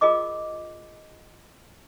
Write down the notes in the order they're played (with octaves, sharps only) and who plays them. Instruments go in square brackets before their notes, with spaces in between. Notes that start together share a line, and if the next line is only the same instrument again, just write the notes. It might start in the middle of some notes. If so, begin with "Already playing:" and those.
[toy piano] F4 G#4 A#4 D#5 D6